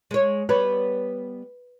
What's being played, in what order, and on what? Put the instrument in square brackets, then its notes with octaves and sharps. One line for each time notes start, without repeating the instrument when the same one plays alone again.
[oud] G#3 C#5
[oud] G3 B3 C#5 [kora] B4